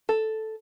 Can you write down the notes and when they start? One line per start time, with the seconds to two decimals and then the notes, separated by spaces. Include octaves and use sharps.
0.09 A4